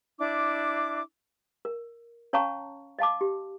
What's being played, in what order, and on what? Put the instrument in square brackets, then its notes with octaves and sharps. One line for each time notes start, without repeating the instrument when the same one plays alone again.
[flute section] D4 E4 D6
[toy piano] A#4
C#4 C#5 F5 A5 A#5 C#6
D#5 F5 A5 D6
G4